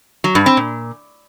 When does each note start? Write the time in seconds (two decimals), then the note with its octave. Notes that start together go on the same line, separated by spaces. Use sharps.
0.24 F#3
0.35 G2
0.46 C4
0.57 A#2